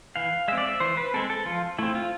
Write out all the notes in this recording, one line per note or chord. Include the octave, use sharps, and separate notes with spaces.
E3 F5
G#3 C4 E5
D5
E5
E3 C5
B4
G#3 C4 A4
A4
F3 F4
A3 C4 E4
F4